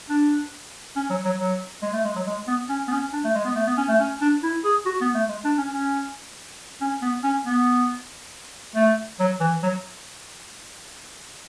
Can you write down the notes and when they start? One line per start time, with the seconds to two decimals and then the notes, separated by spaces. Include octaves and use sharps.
0.10 D4
0.96 C#4
1.10 F#3
1.25 F#3
1.39 F#3
1.82 G#3
1.93 A3
2.05 G#3
2.16 F#3
2.27 G#3
2.47 B3
2.69 C#4
2.88 B3
2.92 C#4
3.13 D4
3.24 A3
3.35 G#3
3.45 B3
3.56 A3
3.67 B3
3.77 C#4
3.89 A3
4.00 C#4
4.22 D4
4.43 E4
4.65 G#4
4.86 F#4
5.01 B3
5.15 A3
5.29 G#3
5.44 D4
5.58 C#4
5.73 C#4
6.81 C#4
7.02 B3
7.24 C#4
7.46 B3
8.75 A3
9.20 F#3
9.40 E3
9.63 F#3